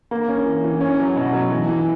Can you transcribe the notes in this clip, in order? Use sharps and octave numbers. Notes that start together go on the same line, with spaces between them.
A#3
C#4
E3
E3
C#4
F#3
B2
F#3
E3
E3